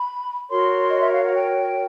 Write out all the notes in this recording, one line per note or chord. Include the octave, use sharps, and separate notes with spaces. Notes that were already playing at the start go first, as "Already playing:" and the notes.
Already playing: B5
F#4 A#4 C#5 C6
D#5
E5
F5
F#5
G5